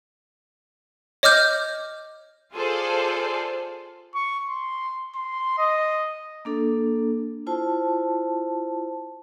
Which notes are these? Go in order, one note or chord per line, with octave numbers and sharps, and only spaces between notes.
C#5 D#5 D6 F6 G6
F4 G#4 A4 C5 D5
C#6
C6
C6
D#5
A#3 D4 A4
E4 F4 C5 A5